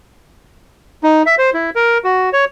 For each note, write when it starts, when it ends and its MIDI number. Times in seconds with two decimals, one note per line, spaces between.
1.03 1.23 63
1.26 1.35 76
1.38 1.50 72
1.54 1.70 64
1.76 1.98 70
2.04 2.29 66
2.33 2.45 73